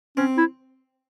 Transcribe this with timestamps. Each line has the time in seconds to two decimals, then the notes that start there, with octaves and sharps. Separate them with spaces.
0.17 C4 C#4
0.38 E4